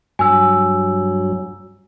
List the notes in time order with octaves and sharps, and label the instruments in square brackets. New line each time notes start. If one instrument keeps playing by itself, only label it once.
[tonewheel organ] G2 F#3 [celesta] G#5 E6